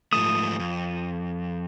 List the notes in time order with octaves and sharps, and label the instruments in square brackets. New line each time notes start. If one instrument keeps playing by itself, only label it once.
[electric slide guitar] G#2 F3 A3 [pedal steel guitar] D#6
[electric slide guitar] F2